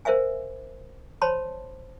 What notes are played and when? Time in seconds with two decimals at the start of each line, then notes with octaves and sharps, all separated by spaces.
0.05 A#4 C5 E5 F5 G#5
1.22 C5 C#5 A5 B5 C6